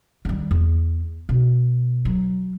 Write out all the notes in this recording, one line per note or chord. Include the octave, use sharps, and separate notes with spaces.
D#3 G3
E2
B2
F#3